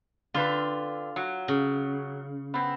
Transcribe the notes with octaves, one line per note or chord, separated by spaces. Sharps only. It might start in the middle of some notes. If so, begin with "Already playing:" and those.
D3 C4 F4 B4
F#3
C#3
B3 C4